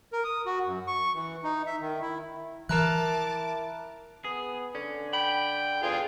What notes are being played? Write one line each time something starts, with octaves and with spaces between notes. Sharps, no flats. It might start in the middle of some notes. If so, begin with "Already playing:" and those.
A#4
D#6
F#4
F#2
C#6
E3
D#4
E5
D#3
E4
E3 E4 A#4 A5 A#5 D6 F#6
B3 G#4
D3 C#4
G5 B5
E2 F4 G#4 G5